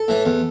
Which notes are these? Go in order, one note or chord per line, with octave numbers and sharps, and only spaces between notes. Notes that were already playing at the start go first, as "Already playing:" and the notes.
Already playing: A4
A2 E3
E2